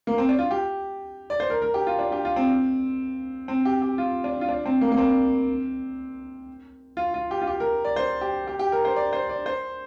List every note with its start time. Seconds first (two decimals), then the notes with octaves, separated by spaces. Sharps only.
0.07 A#3
0.18 C4
0.29 D4
0.39 F4
0.51 G4
1.30 D5
1.40 C5
1.50 A#4
1.62 A#4
1.74 G4
1.87 F4
1.99 D4
2.12 G4
2.25 F4
2.36 C4
3.48 C4
3.65 G4
3.82 G4
3.98 F4
4.24 D4
4.41 F4
4.49 D4
4.66 C4
4.81 A#3
4.92 A#3
4.98 C4
6.97 F4
7.14 F4
7.31 G4
7.41 F4
7.47 G4
7.60 A#4
7.85 D5
7.96 C5
8.21 G4
8.47 G4
8.59 G4
8.72 A#4
8.85 C5
8.96 D5
9.13 C5
9.29 D5
9.46 C5